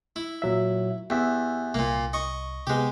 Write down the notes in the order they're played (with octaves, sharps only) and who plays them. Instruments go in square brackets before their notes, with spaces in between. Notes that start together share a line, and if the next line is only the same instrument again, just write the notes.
[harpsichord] E4
[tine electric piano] A#2 F#3 E5
[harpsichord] E2 [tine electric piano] G4 E5
[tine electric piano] C2 [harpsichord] A#2 A#3
[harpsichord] D#5 C#6
[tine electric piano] C3 B3 [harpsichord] G#3 G4